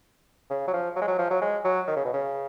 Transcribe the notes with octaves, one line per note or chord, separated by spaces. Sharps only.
C#3
F#3
F3
F#3
G#3
F#3
F3
F#3
G#3
F#3
D#3
C#3
B2
C#3